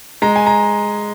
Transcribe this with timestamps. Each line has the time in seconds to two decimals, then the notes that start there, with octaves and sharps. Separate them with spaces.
0.22 G#3 A#5
0.36 G#5
0.46 A#5